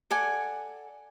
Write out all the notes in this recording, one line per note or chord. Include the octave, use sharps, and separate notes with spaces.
A4 D5 F#5 G#5